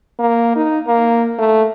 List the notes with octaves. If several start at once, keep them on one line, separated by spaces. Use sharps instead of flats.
A#3
D#4
A#3
A3